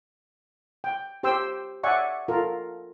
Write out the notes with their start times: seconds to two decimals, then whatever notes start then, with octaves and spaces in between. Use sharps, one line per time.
0.84 G5
1.23 G4 C5 G5 C6 E6
1.84 D5 E5 F#5 G#5 C#6
2.28 F4 A4 A#4